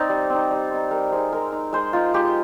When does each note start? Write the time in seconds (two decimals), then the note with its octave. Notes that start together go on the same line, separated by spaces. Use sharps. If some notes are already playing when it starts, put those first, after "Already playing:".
Already playing: C4 D#4 D5
0.09 G3
0.30 C4 D#4
0.51 G3
0.71 C4 D#4
0.91 G3 A#4
1.12 C4 D#4 G#4
1.32 G#3 A#4
1.52 D#4
1.73 G#3 C5
1.93 D#4 F4
2.14 G#3 G4